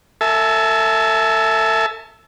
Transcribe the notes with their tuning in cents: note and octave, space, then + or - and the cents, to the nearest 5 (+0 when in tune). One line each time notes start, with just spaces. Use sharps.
A4 +35 E5 +0 A5 -45